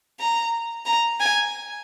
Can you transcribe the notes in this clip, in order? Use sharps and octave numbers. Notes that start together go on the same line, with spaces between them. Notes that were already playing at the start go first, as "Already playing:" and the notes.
A#5
A#5
G#5